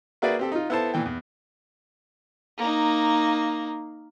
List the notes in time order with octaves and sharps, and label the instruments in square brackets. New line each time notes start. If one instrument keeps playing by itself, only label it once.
[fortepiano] A#3 F#4 G#4 B4 D5 E5
C4 G4 A4
D#4 F4
B3 E4 A4 C5 A5
A#2 E3 G5
E2
[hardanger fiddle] A#3 D#4